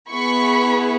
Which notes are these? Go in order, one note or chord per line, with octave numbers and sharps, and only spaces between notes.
B3 E4 G#4 B5 C#6